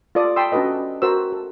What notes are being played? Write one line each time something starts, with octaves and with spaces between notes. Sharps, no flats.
F4 A4 D5 D#6
G5 A5 B5 C6 D#6 E6
C#4 D4 F#4 A4 B4 D#5
F#4 A#4 C5 E6
A4